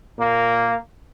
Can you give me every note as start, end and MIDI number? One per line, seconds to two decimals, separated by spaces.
0.17 0.75 46
0.17 0.75 58